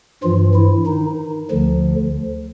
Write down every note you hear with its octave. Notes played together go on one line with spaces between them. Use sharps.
G2 E3 F3 F4
E3 E4
D#3 D#4
D2 D3 F3